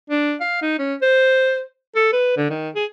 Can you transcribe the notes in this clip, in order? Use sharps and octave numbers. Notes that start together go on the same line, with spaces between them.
D4
F5
D#4
C#4
C5
A4
B4
D3
D#3
G#4